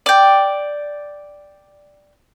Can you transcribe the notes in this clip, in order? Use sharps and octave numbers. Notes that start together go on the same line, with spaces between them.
D5 G5